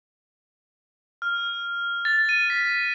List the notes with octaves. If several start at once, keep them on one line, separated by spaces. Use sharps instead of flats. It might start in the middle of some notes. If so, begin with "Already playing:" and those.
F6
A6
D#7
B6